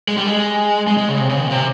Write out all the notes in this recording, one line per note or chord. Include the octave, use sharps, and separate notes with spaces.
G#3
G3
G#3
G#3
G#3
C#3
C3
C#3
D#3
A#2
C3